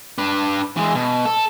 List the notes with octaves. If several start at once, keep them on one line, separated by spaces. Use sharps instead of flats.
D4 B4
E3 G#3
B2
A4